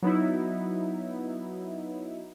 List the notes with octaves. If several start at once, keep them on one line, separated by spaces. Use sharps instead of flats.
F#3 B3 D#4 E4